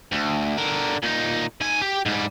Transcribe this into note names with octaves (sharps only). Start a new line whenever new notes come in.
D2
D3 A#4
A#2 D#4
D#3 G#5
G4
G#2 G3